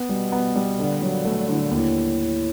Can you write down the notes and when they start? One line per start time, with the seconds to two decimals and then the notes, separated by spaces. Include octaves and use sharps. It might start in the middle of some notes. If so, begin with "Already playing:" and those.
Already playing: B3
0.09 B2 G3
0.32 B3
0.56 G3
0.79 A#2 D3
1.02 A#2 F#3
1.24 B2 A3
1.36 A#2
1.46 A2 D3
1.58 A#2
1.71 D#2 A2